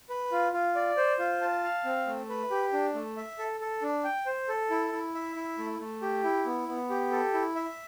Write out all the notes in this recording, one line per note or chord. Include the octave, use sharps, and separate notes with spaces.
B4
F4
F4
D5
C5
F4
A5
F5
C4
A3
B4
G4
D4
A3
E5
A4
A4
D4
G5
C5
A4
E4
E4
E5
E4
A3
A3
G4
E4
B3
B3
G4
A4
E4
E5